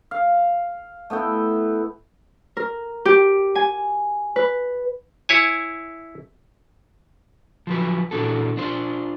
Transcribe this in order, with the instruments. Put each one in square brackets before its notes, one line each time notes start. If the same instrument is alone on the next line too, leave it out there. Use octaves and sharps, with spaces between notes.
[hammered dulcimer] F5
A3 B3 E4 G5
[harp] A#4
G4
G#5
B4
[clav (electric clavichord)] E4 C#5 G#5
[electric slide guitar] F3 F#3 B4
A#2 E3 D4 F#4 A4
D4 F4 C5